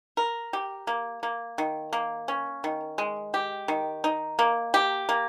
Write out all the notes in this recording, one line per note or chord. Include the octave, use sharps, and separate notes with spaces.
A#4
G4
A#3
A#3
D#3
A#3
C#4
D#3
G#3
G4
D#3
D#4
A#3
G4
A#3